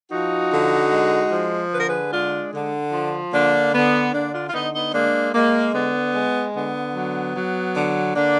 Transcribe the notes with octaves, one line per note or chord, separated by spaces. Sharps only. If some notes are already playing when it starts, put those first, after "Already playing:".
F3 D#4 F#4
D3
G#3
F3
D3 B4
A#4
G#4 B4
G#3 D4 F4
D3
F3
D3 A#3 D4
D3 B3
D3 A#3 D4
D4 F4
F4
D3 B3 D#4
B3 D#4
G#3 A#3 D4
G#3 A#3
D3 B3
G#3
D3 B3
F#3
F#3
D3
D3 A#3 D4